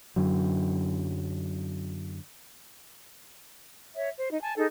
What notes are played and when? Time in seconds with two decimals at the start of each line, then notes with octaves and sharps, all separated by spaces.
0.16 F#2 D3 F#3
3.95 C#5 E5
4.18 C5
4.30 D#4
4.42 G#5 A5
4.57 D#4 G#4 A4